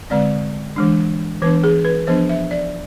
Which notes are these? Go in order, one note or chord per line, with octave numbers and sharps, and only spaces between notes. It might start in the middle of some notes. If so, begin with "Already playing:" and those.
D3 G#3 C4 D5
E3 G#3 D4
E3 B3 D4 B4
G#4
B4
F3 B3 D4 C5
E5
D5